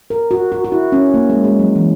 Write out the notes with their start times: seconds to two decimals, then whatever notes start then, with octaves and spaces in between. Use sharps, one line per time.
0.10 A#4
0.31 F#4
0.52 F#4
0.65 F#4
0.72 E4
0.92 C#4
1.14 A#3
1.29 G#3
1.44 G#3
1.59 F#3
1.75 E3